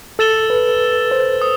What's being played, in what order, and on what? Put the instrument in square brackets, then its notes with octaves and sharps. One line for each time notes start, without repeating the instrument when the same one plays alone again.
[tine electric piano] A4 [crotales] E6 A6 E7 G7
[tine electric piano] B4
C5
[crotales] D#6